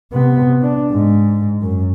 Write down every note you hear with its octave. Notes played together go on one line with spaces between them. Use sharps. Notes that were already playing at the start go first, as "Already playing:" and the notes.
C3 B3
D4
G#2
F#2